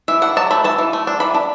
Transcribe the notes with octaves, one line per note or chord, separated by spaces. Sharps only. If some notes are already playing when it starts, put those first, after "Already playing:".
E3 E5
D4 F#5
F#3 A5
A3 B5
E3 A5
E3
A3
D4
E3 B5
D4